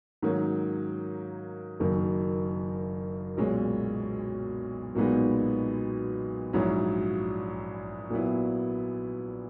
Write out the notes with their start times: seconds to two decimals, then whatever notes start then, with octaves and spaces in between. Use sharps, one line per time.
0.22 G#2 D#3 F#3 A#3 C#4
1.80 F#1 F#2 D#3 A#3
3.37 B1 A#2 G#3 C#4
4.95 B1 A#2 G#3 B3 D#4
6.53 A#1 G#2 F#3 C#4 E4
8.10 A#2 F#3 B3 E4